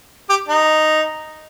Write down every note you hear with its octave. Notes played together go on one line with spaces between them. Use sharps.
G4
D#4